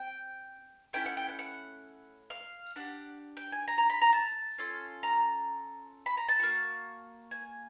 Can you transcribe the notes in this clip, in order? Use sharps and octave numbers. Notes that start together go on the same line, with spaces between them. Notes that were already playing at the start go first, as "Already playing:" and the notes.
Already playing: C4 G5
A3 C#4 E4 G5
F#5
G5
F#5
F#5
F5
D4 G4 F#5
G5
G#5
A#5
A#5
B5
A#5
A5
C#4 F4 A4
A#5
B5
A#5
A5
A#3 D#4 F#4
G#5